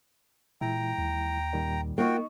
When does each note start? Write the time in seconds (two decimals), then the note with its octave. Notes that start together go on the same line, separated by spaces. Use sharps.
0.61 A#2 E3 G#3 E4 G5 A#5
0.98 D#2
1.53 A#2 D#3 G3
1.98 A#3 D#4 F4 F#4 D#5 G5 C#6